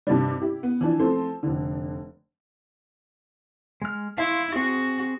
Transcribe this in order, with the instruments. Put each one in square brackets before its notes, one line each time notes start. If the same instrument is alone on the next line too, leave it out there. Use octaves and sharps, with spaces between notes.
[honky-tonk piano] G2 C3 D#3 G3
E4 G4
B3
E3 F3 D4
F3 A3 C4 C5
F1 D3
[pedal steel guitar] G#3 F6
[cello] E4 [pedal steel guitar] F5 C6 C#6
[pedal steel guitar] C4 G#4 [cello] F#4